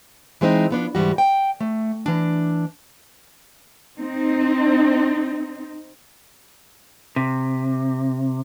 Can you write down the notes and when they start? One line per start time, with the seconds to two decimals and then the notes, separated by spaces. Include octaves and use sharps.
0.41 E3 G#3 C4 D#4
0.70 F3 B3 D4
0.95 D2 G#2 E3 G3 F#4
1.18 G5
1.61 A3
2.06 E3 D4
3.98 C4 D#4
7.16 C3